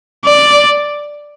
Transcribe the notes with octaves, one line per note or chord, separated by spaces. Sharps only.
D5